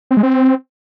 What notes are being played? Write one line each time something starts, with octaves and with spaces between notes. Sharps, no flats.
C4
G#3
C4